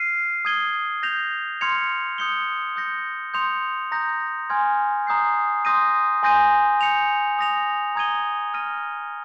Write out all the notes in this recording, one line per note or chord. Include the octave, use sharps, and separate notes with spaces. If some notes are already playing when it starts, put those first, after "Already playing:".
Already playing: F6 C7 D#7
D#6 G#6 D#7 G7
G6 A#6 F7
C6 F6 G#6 C#7 F7
D#6 G6 C#7 G7
D#6 G6 A#6 C#7
C6 D#6 G6 C#7 F7
A#5 D#6 G6 A#6
G#5 C6 F6 G#6
A#5 D#6 G6 C7
C6 D#6 G6 A#6 D#7
G#5 C6 G6 A#6 D#7
G6 C#7 F7
D#6 A#6 F7
A#5 D#6 G#6 D#7 G7
F6 A#6 D#7